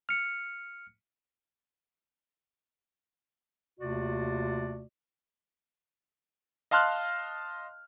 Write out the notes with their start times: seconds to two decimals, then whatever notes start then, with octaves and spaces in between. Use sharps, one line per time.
0.09 F6 C#7
3.80 D#2 C3 A3 F4 F#4 D5
6.71 D#5 F5 A5 C6 F6 F#6